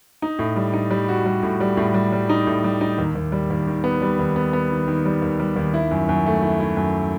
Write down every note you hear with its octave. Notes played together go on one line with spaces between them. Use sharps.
D#4
A2
G3
D#4
G3
F#4
G3
A2
G3
A2
G3
G3
D#4
A2
G3
D#4
D#2
D#2
G3
D#2
D#3
B3
G3
D#2
B3
B3
D#3
D#3
G3
D#2
G3
D#2
E4
F#2
F#2
A3
E4
E4
F#2